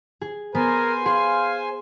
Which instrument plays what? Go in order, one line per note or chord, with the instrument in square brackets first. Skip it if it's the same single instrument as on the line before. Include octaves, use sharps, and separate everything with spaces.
[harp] G#4
[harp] B3 [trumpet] A#4 [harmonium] C5 G#5
[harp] G#4 C6 [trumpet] F5